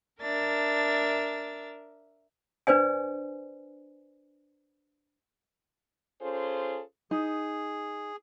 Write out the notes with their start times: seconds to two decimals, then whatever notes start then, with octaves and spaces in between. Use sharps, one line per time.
0.22 D4 A#4 E5 A6
2.67 D4 B4 C5 D5 G#5
6.22 C#4 F4 G#4 A4 C5
7.11 D#4 G#4